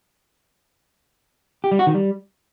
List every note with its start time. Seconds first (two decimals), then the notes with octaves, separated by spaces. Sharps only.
1.64 G4
1.71 G3
1.79 F#4
1.87 D#3
1.94 G3